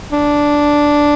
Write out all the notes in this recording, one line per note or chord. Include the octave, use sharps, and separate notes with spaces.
D4